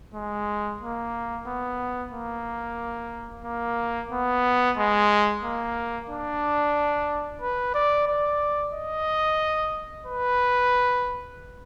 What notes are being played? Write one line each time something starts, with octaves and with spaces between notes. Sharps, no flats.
G#3
A#3
B3
A#3
A#3
B3
G#3
A#3
D4
B4
D5
D5
D#5
B4